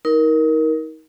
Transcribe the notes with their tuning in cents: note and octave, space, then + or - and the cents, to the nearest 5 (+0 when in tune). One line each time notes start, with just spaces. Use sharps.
D#4 +30 A#4 +10